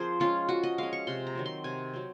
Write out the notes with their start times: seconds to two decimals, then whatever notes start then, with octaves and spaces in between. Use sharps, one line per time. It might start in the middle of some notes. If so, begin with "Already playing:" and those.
Already playing: F3 C4 G#4 A#4 C5
0.20 G#3 C#4 F4
0.48 F3 F#4
0.63 D#5
0.78 G#3 C#4 F5
0.93 C#6
1.07 C3 C6
1.27 A#5
1.35 D#3 F#3 C4
1.46 C6
1.64 C3 G#5
1.93 F#3 C4